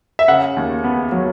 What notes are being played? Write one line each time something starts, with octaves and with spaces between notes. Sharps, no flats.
E5
C#3 F#5
D#2
B3
F#3